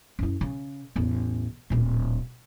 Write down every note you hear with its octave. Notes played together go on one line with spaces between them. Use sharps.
F#2 E4
C#3
A1 E2
D1 A#2